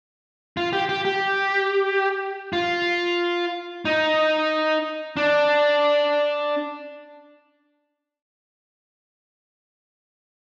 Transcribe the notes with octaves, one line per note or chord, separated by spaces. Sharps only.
F4
G4
G4
G4
F4
D#4
D4